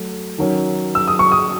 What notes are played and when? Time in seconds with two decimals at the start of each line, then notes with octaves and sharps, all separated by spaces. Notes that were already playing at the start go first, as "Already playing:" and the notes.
Already playing: F#3 A3
0.38 D#3 F#3 C#4
0.95 E6
1.08 D#6
1.19 C#6
1.32 D#6